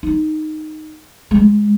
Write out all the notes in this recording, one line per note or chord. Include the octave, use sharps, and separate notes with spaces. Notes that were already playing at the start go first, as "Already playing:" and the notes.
D#4
G#3